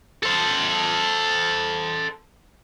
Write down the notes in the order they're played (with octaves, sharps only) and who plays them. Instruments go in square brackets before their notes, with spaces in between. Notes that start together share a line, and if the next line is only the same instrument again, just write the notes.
[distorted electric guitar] A4 C5